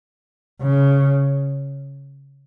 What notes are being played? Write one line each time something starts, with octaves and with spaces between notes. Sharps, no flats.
C#3